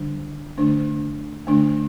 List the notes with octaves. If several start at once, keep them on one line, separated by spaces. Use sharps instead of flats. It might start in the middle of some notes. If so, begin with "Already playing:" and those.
Already playing: D3 G3 D4
D3 A3 D4
D3 A3 D4